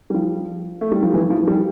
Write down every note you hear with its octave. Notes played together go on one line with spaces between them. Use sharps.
G3
F3
A3
G3
F3
E3
F3
G3